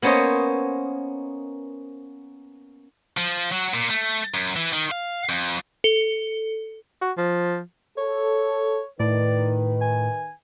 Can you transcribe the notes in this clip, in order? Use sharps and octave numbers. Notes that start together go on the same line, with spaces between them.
A#3 B3 C#4 C5 C#5 D#5
F3
F#3
A#2
A3
F#2
E3
D#3
F5
F2
A4
F#4
F3
A4 C#5
A2 D#3 B4 D5
G#5